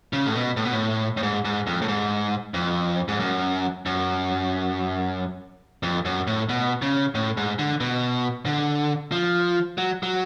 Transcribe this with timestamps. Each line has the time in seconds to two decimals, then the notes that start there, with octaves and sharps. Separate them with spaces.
0.13 C#3
0.26 A2
0.35 B2
0.57 A2
0.64 B2
0.73 A2
1.17 A2
1.23 G#2
1.45 G#2
1.67 F2
1.82 A2
1.88 G#2
2.54 F2
3.08 G#2
3.20 F#2
3.86 F#2
5.83 F2
6.05 F#2
6.27 A2
6.49 B2
6.82 C#3
7.15 A2
7.37 G#2
7.59 D3
7.80 B2
8.46 D3
9.12 F3
9.78 F#3
10.03 F#3